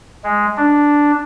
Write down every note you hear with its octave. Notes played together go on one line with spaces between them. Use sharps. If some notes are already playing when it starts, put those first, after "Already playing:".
G#3
D4